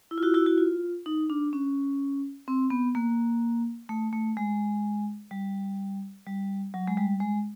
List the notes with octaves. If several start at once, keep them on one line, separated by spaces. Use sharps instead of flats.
E4
F4
E4 F#4
E4 F#4
E4 F#4
F4
D#4
D4
C#4
C4
B3
A#3
A3
A3
G#3
G3
G3
F#3
G#3
G3
G#3